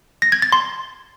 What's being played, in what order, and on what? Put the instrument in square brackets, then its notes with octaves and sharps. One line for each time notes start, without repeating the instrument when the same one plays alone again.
[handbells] A#6
G#6
A6
C6